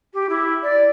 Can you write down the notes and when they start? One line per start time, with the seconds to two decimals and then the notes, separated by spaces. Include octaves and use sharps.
0.13 G4
0.29 E4
0.63 D5